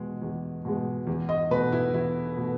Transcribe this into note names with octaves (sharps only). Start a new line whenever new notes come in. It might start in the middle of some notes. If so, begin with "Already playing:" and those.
Already playing: E2 B2 G#3
E2
B2 G#3
E2
D#5
B2 A3 B4
E4
E2 E4
B2 A3